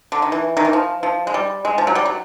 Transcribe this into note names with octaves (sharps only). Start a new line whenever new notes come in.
D3
D#3
E3
D#3
E3
F3
F3
G#3
G3
G#3
F3
F#3
G3
F#3